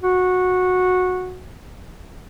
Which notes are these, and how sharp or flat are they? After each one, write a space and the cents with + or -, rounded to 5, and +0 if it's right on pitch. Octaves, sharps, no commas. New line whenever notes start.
F#4 -15